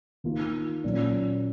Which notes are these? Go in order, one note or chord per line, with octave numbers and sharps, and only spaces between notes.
D#3 A#3 F4
A#2 F#3 C#4